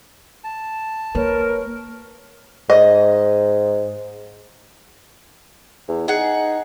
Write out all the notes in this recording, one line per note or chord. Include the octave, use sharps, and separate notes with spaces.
A5
A#3 A#4 B4 C#5
G#2 D#5
E2
D#4 G#4 F#5